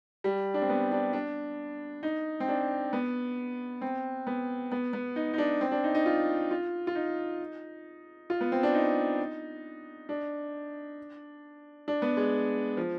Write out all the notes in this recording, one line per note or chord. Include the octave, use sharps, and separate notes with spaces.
G3
D4
C4
B3
D4
D4
D#4
C4
D4
B3
C4
B3
B3
B3
D#4
D#4
D4
C4
D4
D#4
D#4
F4
F4
F4
D#4
F4
B3
C4
D4
D#4
D4
D4
B3
G#3
F3